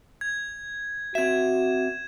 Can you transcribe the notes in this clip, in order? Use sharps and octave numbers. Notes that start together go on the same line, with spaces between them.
G#6
C4 F#4 E5 G#6 E7